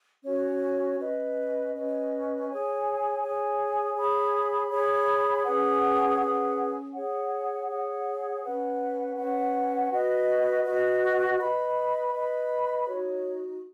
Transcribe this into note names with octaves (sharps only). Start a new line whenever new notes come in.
C#4 F#4 C#5
C#4 B4 D#5
C#4 B4 D#5
G#4 C#5 G#5
G#4 C#5 G#5
G#4 C#5 B5
G#4 C#5 B5
C#4 G#4 B4 F#5
C#4 G#4 B4 F#5
G#4 C#5 F#5
G#4 C#5 F#5
C#4 B4 F#5
C#4 B4 F#5
F#4 B4 D#5
F#4 B4 D#5
B4 D#5 B5
B4 D#5 B5
D#4 F#4 C#5